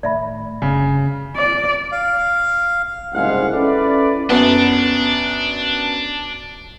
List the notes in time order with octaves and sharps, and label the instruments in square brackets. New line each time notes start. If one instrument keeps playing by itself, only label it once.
[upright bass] A2 D#3 [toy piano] D5 E5 B5
[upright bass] F#1 G2 [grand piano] C#3
[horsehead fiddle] D5
[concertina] F5
[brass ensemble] F#1 C2 G#2 G#3 F5 F#5
C#4 E4 A4 B4 D5
[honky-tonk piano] F#2 B3 [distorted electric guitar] D4